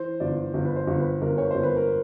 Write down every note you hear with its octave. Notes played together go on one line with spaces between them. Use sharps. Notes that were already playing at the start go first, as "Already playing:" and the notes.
Already playing: E3 C5
G1 D5
G1
B4
C5
G1
B4
G1 A#4
C#5
G1 C5
B4
A#4